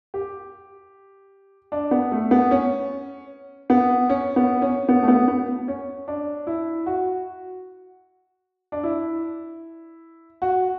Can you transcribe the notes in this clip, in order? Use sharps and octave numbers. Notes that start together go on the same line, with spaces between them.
G4
D4
B3
A3
B3
C#4
B3
C#4
B3
C#4
B3
A3
B3
B3
C#4
D4
E4
F#4
D4
E4
F#4